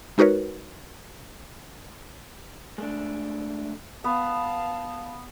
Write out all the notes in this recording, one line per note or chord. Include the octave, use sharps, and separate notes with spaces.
G#3 D#4 F#4 A#4 B4 C#5
G#3 A3 D4
B3 F5 A5